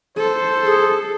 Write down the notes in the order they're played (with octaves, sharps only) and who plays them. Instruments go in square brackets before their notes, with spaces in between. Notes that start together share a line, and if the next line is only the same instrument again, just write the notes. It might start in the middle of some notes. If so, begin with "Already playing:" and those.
[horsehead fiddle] A4 [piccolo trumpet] C5
[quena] G#4